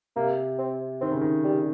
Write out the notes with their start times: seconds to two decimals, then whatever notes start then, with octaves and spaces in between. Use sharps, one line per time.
0.16 C3 A#3
0.59 C4
1.01 D#3 C4
1.12 C#3
1.21 D#3
1.44 G3